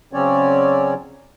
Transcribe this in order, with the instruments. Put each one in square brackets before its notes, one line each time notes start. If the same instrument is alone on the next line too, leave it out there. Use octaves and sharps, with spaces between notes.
[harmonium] C#3 F#3 C4 C#4 C#5 D5